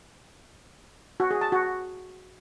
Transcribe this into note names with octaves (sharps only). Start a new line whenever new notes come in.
F#4
G#4
A5
F#4